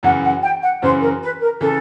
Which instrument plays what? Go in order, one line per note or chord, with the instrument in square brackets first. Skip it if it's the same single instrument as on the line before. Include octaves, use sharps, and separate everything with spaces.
[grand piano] F#2 C#3 E3 [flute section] F#5
[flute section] F#5
G5
F#5
[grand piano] F#2 C#3 E3 [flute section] C5
[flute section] A#4
B4
A#4
[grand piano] C#3 E3 [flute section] A4